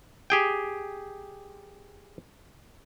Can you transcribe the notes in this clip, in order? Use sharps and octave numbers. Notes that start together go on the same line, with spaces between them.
G4 G#4 G5